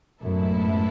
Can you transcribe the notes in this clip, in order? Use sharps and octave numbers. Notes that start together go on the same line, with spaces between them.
F#2 A2 G#3 B3 E4 A4